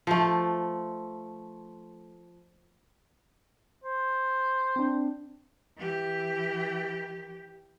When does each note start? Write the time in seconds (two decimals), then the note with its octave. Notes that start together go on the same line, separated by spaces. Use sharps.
0.07 F3 A3
3.84 C5
4.76 C4 D4
5.77 E3 G4